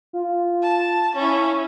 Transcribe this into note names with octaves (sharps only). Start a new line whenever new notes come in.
F4
A5
C#4 E4 C#5